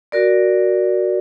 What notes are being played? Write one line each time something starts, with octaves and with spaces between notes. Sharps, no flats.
F#4 A#4 D5